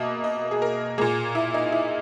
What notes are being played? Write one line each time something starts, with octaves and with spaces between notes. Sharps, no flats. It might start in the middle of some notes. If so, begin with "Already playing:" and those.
Already playing: B2 A#3 D#5 E5
D#5
G#4
A#4
A#2 A#3 G#4
E4
D#4
E4